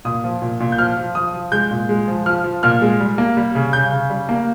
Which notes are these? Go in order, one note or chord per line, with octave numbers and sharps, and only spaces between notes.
A#2 D#6
F3
A#2
A#2
G6
F3 F6
F3
F3 D#6
F3
G#3 G6
A#2
G#3
F3
F3 F6
F3
A#2 F6
G#3
G3
A#3
G3
C#3
C#3 G6
C#3
G3
A#3